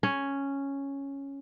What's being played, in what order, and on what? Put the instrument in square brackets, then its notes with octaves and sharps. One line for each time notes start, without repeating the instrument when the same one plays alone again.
[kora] C#4